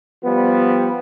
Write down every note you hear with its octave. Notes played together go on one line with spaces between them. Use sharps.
F3 G3 B3